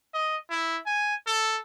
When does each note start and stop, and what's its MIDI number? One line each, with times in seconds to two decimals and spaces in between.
0.14 0.37 75
0.50 0.79 64
0.86 1.15 80
1.27 1.59 69